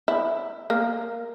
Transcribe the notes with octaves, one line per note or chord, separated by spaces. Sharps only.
E4
A#3